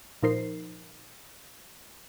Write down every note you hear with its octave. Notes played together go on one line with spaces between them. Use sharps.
A#2 F3 D#4 A#4 C5 C7